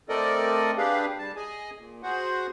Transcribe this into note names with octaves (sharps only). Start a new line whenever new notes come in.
A3 C4 A4 A#4 D5 D#5
D4 G4 G#4 B4 F5
G3 A5
G#4 D#5 G#5
A#2
F#4 G#4 C5 F#5